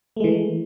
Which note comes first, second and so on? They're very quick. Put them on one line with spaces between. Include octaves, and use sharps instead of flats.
A3 G#3 E3